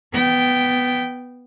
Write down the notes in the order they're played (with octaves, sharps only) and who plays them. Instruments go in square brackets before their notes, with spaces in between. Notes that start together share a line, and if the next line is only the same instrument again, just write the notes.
[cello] B3 G5